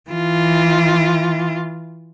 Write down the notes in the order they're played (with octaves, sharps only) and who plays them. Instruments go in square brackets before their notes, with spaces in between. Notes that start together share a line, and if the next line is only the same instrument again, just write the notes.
[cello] E3 F4